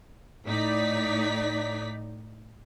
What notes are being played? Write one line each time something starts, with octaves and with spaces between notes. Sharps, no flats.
A2 D#4 D5 B6